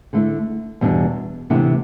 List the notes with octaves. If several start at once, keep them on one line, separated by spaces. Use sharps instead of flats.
D3 A3 E4
E2 B2 G3 D4
D2 C3 E3 B3 D4